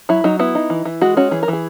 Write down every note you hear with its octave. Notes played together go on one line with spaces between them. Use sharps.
F#3 E4
F#3 D#4
B3 E4
D#4
E3
E3
G#3 F#4
C#4 F#4
E3 G#4
A#4
E3 G#4